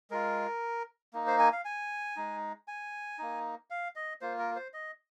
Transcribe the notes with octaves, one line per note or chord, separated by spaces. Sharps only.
G#3 F4 A#4
A#3 D#4
C5
G#5
F5
G#5
G#3 D#4
G#5
A#3 D#4
F5
D#5
A#3 F4 C5
A#4
C5
D#5